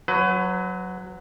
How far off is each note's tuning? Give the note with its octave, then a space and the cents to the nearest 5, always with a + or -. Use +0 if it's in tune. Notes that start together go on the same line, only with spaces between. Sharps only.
F#3 -5 B4 +30